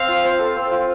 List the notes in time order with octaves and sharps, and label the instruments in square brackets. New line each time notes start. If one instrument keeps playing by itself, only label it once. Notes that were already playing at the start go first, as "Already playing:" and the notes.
Already playing: [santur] C4 [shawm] F5
[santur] F4
C5
A4
C4
F4